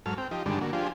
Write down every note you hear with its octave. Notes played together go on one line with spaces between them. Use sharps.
G#2 F#3 A4 F6
C4 G5
F3 D#4 G4
G2 D3 D#3 G3 G#3 D4
D3 A#3 F#4
F3 D4 F4 G4 G#4 C5